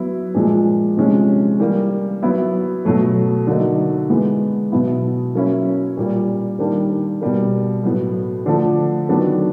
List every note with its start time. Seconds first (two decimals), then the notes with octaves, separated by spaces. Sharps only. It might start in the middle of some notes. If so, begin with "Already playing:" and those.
Already playing: F#3 B3 E4
0.35 A#2 F3 G#3
0.97 C3 F3 G#3 C#4
1.59 E3 G3 A#3
2.22 F#3 B3 E4
2.85 B2 F#3 A3
3.47 D3 F#3 A#3 D#4
4.10 E3 G#3 B3
4.72 B2 F#3 B3 E4
5.35 F#3 A#3 C#4 E4
5.97 A#2 G3 A#3
6.59 D#3 G3 A#3 D4
7.21 B2 G3 A#3
7.83 A2 F#3 B3
8.46 D3 F3 A3 D4
9.09 D#3 F#3 B3 D4